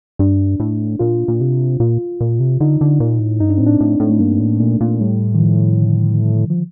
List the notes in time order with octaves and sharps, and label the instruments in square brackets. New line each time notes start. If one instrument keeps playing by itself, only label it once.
[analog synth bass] G2 [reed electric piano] D4
[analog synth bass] A2
[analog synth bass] A#2 [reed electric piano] F4
[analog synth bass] A#2
C3
[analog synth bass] A#2 [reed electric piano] F4
[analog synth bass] A#2
C3
[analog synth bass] D3 [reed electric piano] D#4
[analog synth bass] D3
A#2
A2
[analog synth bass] G2 [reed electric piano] D#4
[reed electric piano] D4
[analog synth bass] A2 [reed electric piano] C4
[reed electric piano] D4
[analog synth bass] A2
A2
[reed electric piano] A3
[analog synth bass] G2 [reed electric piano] A#3
[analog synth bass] A2
[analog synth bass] A#2 [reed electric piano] A3
[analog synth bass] A#2
[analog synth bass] A2 [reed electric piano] G3
[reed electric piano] D#3
F3
D3
F3